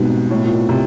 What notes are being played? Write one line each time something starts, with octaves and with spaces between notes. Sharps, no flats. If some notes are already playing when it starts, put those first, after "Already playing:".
Already playing: G#2 B2 G3 C4 D#4 F#4
A2
A#2
C3